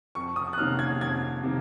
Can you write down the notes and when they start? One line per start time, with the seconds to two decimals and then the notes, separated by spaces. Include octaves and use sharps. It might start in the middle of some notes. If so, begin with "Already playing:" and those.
0.15 F2 C#6
0.36 D#6
0.53 F#6
0.58 C3 D#3 A#3 C#4 F6
0.79 G#6
1.01 F2 G#6
1.43 C3 D#3 A#3